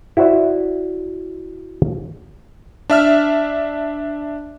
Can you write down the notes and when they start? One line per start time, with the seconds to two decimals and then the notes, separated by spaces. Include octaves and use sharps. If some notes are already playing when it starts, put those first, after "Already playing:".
0.17 E4 F#4 C5 D5 E5
2.90 D4 E5 F6